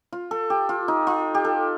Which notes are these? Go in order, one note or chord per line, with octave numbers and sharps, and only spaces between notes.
F4
A4
G4
F4
D#4
F4
G4
A4